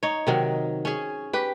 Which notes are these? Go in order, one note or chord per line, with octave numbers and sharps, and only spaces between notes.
D#4 C#5
C3 D#3 F#3
C#4 G#4
G4 B4